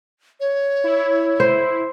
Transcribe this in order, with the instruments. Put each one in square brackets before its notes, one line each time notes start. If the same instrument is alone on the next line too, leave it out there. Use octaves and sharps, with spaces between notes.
[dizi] C#5
[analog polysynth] E4
[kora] C5